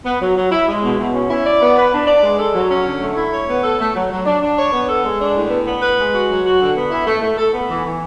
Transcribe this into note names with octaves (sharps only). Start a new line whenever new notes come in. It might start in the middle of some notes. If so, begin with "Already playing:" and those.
B3
F#3
F#3
E4
G#3
B2
B2
C#4
E4
D5
B3
B4
D4
D5
G#3
A4
F#3
C#4
D3
A3
E4
C#5
B3
A4
A3
F#3
F#3
D4
D4
C#5
B3
A4
G#3
D4
A2
B3
B3
B4
G#3
F#4
F#3
F#4
D3
B3
E4
A3
A3
A4
B3
E3
E3